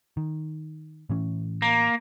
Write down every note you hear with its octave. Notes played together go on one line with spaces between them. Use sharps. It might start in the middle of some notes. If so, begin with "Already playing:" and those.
D#3
A2 E3 C#4
A#3